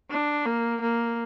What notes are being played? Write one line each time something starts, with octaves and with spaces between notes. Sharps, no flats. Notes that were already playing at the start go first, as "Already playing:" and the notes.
D4
A#3
A#3